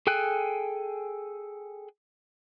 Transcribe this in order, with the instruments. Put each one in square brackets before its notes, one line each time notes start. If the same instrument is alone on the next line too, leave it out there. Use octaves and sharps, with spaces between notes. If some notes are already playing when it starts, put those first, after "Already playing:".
[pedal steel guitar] G#4 A4 G5 G#5 F#6